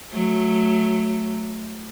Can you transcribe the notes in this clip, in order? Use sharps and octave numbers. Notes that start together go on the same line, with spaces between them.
F#3 A3